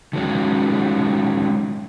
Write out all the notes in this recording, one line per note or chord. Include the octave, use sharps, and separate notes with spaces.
D#3 F#3 G#3 C#4